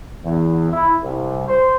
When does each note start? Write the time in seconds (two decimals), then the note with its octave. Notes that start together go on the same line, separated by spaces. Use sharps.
0.24 E2
0.71 E4
1.01 C2
1.47 C5